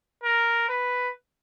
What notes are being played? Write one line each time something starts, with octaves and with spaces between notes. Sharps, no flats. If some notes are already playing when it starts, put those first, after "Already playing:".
A#4
B4